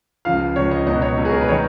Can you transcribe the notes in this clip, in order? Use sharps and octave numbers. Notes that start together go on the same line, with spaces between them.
C#2 C#3 F3 F5
C#2 C#3 F3 C#5
D#5
C#2 B2 F#3 D#5
C#5
C#2 B2 F#3
G#4
A#4
B4
D#3 F#3 C#5